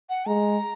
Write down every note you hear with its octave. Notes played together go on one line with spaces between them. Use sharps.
F#5
G#3 A#5